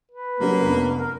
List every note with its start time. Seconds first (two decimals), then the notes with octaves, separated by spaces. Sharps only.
0.12 B4
0.40 F#3 G3 A#3 C#4
0.61 F1 B3 D4
0.99 A#4